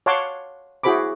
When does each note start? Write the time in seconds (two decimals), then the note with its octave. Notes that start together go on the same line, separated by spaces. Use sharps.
0.06 C#5 F5 F#5 A5 C6 D6
0.83 E4 F#4 G#4 C5 B5 D6